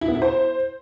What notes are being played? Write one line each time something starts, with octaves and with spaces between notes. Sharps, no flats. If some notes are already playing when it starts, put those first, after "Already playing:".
E4
B3
E4
C5